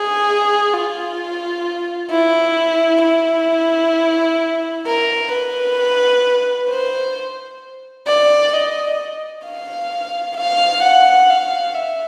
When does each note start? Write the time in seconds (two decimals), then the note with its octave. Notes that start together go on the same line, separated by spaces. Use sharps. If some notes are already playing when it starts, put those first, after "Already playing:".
Already playing: G#4
0.73 F4
2.11 E4
3.03 E4
4.86 A#4
5.32 B4
6.69 C5
8.07 D5
8.54 D#5
9.46 F5
10.37 F5
10.83 F#5
11.30 F5
11.75 E5